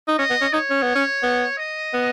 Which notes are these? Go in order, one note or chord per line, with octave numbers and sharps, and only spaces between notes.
D#4
C#4 D#5
B3
C#4
D#4 C#5
C#4
B3
C#4
B3
D#5
B3